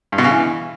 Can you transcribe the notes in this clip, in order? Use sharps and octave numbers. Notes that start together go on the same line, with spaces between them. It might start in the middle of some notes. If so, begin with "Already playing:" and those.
G2
B2
C#3
E3